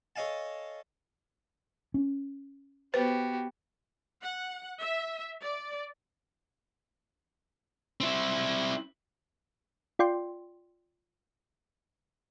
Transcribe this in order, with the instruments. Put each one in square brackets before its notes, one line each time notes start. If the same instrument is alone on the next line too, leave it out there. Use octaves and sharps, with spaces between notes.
[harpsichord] A4 C#5 D#5 F5 G#5 A5
[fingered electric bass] C#4
[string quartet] B3 [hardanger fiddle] F#4 G4 [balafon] B4 C5
[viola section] F#5
E5
D5
[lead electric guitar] C4 E4
[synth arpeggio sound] F4 D5 G5 C6